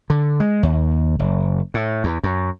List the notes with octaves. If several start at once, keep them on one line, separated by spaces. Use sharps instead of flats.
D3
G#3
D#2
F#1
A2
E2
F#2